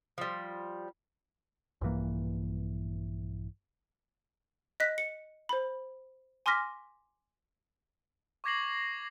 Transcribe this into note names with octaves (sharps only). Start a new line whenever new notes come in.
F3 G3
A#1 G2 E3 A#3
D#5 F#6 B6
C#7
C5 B5
G#5 C6 D6 F6 A#6 B6
C#6 D6 G#6 A#6 C7 F#7